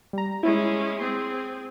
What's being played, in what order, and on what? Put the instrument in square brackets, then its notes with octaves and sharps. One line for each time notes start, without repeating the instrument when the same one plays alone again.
[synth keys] G3 A#5
[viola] G#3 C#4 [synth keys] E4
[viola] C4 G#4 [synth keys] C6